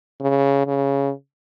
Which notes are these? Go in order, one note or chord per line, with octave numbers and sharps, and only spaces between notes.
C#3
C#3